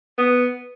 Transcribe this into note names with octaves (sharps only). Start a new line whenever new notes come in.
B3